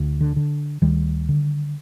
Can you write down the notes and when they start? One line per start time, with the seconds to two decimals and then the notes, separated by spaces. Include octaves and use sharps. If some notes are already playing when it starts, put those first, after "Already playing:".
Already playing: D2
0.21 D3
0.36 D3
0.82 D2 D#3 G3
1.29 D3